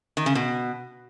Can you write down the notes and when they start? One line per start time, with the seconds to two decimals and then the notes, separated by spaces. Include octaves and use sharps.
0.17 D#3
0.26 C#3
0.35 B2